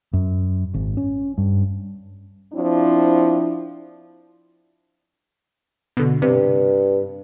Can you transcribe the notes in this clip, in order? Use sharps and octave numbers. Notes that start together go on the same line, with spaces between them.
F#2
G#1
C#4
G2
F3 C4 D4 E4
B2 D3
G2 C3